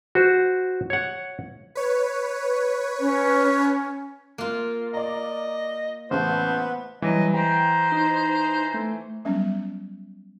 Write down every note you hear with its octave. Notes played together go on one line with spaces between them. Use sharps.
F#4 C5
C#5 F#5
B4 C#5
C#4
A#3 F4
D5 D#5 A#5
A1 C#3 B3 C5 A5
E3 F#3 G3 D#5
C5 G5 A#5
D#4
A3
F#3 G3 B3 C#4